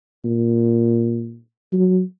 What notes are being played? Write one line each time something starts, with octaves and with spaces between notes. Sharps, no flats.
A#2
F#3